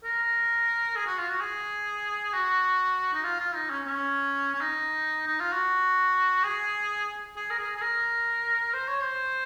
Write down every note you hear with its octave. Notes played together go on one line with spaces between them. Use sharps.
A#4
G#4
F#4
F4
F#4
G#4
F#4
D#4
F4
F4
D#4
C#4
C#4
C#4
D#4
D#4
F4
F#4
G#4
G#4
A#4
G#4
G#4
A#4
C5
C#5
C5